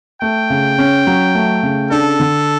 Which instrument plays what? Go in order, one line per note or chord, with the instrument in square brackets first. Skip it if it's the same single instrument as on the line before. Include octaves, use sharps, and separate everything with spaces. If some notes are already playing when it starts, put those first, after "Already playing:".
[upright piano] A3 [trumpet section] G5
[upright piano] C#3
C#4
F#3
A3
C#3
[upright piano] D4 [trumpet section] A4
[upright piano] D3